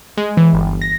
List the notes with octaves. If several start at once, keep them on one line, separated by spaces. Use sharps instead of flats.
G#3
E3
G1
A#6